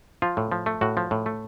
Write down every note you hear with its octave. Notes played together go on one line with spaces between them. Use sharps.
F3 F4
A2
F3
A3
A2 F#4
F3
A2
A3